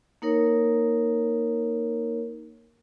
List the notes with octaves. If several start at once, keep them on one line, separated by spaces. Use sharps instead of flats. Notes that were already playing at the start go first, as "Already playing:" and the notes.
A#3 D#4 A#4 C#5